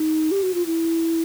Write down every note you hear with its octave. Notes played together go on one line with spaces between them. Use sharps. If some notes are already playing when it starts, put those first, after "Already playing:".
Already playing: D#4
G4
F#4
F4
E4